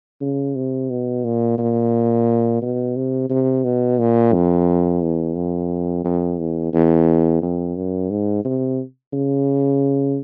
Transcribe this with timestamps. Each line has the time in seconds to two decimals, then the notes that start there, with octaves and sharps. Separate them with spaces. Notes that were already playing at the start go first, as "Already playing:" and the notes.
0.21 C#3
0.55 C3
0.90 B2
1.24 A#2
1.58 A#2
2.62 B2
2.96 C3
3.30 C3
3.64 B2
3.99 A#2
4.33 F2
5.02 E2
5.36 F2
6.04 F2
6.39 E2
6.73 E2
7.42 F2
7.76 F#2
8.10 G#2
8.45 C3
9.13 C#3